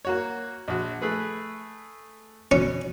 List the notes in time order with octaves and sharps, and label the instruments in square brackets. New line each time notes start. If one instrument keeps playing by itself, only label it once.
[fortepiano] A#3 F#4 C#5
A#1 F#4
A3 G#4 B4
[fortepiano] B2 [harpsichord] C#4